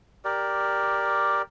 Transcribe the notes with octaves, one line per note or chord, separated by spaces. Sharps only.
G4 A#4 D5